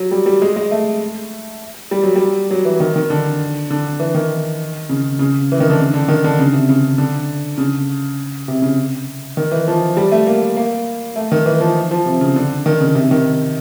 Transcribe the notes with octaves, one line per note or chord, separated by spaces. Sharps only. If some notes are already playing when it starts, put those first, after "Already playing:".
Already playing: F#3
G3
G3
G#3
G#3
A3
G3
F#3
G3
F#3
E3
D#3
D#3
D3
D3
E3
D#3
C#3
C#3
E3
D#3
D3
C#3
D3
D#3
D3
C#3
C3
C#3
D3
C#3
C3
C#3
D#3
E3
F3
G3
A3
A#3
A#3
A3
D#3
E3
F3
F3
C3
C#3
D3
D#3
C#3
C3
D#3